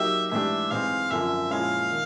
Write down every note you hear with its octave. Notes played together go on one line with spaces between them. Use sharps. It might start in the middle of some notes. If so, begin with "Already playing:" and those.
Already playing: F#3 A#3 D#4 G4 E5
G#2 E3 A3 D4 G4 E5
G#2 E3 G#3 C4 F5
F#2 D3 F3 E5
A#2 F3 G#3 C#4 E4 F5
D#3